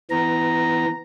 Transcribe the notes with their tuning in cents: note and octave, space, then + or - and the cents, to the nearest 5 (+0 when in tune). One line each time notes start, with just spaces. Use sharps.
E3 +0 B3 +25 A#5 +0